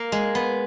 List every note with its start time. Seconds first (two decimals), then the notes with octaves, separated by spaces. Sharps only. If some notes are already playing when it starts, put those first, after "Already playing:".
Already playing: A#3
0.12 G#3
0.35 B3